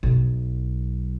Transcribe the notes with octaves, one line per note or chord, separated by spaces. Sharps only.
B1